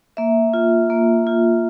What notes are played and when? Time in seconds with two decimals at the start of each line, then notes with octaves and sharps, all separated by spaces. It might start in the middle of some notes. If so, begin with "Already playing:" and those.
0.17 A#3 E5
0.54 F4
0.90 A#3
1.27 F4